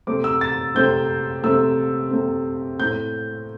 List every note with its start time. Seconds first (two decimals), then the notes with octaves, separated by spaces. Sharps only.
0.07 C3 A3 C4 D6
0.24 E6
0.41 A6
0.75 C3 A3 C4 G6
1.43 C3 A3 C4 E6
2.11 C3 A3 C4
2.79 A2 A3 C4 G6